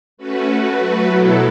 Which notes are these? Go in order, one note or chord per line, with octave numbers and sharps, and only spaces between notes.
A3 C#4 F#4 B4
A3 F#4 B4
F#3 A3 F#4 B4
B2 F#3 B3 E4 A4